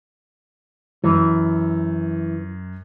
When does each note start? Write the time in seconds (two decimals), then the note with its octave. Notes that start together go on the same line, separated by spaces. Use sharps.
1.04 F#2 E3